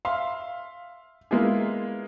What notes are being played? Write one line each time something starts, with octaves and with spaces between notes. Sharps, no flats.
E5 F5 C6
G#3 A#3 B3 E4 F4 G#4